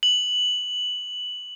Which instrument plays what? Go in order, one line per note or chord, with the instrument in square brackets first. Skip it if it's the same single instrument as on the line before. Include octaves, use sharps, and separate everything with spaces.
[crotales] F#7